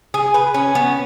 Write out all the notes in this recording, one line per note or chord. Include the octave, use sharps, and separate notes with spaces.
G#4
B4
C#4
B3